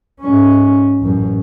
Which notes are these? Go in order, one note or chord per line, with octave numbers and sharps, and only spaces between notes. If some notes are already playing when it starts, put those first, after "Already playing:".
G#2 C#4
A1 F#2